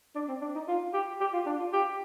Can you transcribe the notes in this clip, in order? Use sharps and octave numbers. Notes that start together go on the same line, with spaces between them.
D4
C4
D4
D#4
F4
G4
G4
F4
D4
F4
G4